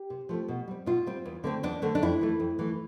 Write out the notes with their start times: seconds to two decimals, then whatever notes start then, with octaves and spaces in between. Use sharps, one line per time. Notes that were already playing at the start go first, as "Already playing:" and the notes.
Already playing: G4
0.10 C3
0.29 F3 A3 C4
0.48 B2
0.68 G3 C4
0.86 B2 F4
1.06 G3 C4
1.25 E2
1.44 D3 A3 C4
1.63 E2 D4
1.82 D3 A3 C4
1.95 D4
2.02 F2 E4
2.21 E3 A3
2.40 F2
2.59 E3 A3